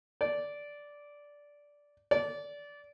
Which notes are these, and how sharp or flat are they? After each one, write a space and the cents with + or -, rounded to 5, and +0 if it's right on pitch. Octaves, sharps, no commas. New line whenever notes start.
D5 -10
D5 -20